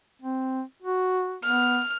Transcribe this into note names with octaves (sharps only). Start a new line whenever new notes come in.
C4
F#4
B3 F6